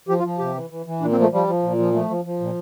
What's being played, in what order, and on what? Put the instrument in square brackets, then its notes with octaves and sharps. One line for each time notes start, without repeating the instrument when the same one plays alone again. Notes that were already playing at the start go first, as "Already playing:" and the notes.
[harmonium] F3 G4
F4
F3
C3 G4
E3
E3
E3
A#2 D4
C4
F3 A3
F3 G3
F3
A#2
F3
F3 A3
F3
F3
A#2